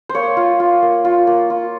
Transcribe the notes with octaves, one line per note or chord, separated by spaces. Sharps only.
C5
A#3 C#5
F4
F4
A#3
F4
A#3
F4